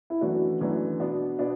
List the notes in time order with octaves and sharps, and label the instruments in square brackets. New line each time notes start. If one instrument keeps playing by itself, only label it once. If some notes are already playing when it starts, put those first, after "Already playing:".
[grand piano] E4
[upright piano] F#2 E3 A3 D4 [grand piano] F#4
[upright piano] F#2 E3 A3 D4
B2 B3 D4
B2 B3 D4